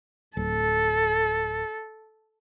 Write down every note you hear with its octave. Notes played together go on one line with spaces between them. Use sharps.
D1 A4